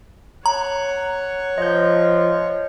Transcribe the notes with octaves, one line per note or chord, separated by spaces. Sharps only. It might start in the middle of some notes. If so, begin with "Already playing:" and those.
C#5 F#5 A#5
F3 D#5 G6